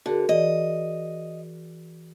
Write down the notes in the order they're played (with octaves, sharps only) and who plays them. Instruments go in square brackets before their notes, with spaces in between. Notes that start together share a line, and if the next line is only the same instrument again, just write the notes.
[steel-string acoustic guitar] D3 [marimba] F#4 G#4 A#4
[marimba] E3 D5 [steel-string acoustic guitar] D#5